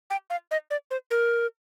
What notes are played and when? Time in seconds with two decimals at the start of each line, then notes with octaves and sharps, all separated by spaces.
0.10 G5
0.30 F5
0.51 D#5
0.71 D5
0.91 C5
1.11 A#4